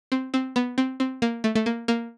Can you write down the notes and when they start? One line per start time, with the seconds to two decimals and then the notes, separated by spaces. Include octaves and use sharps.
0.12 C4
0.34 C4
0.56 B3
0.78 C4
1.00 C4
1.22 A#3
1.44 A3
1.55 A3
1.66 A#3
1.88 A#3